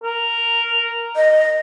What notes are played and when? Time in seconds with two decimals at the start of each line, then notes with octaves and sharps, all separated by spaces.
0.04 A#4
1.16 D#5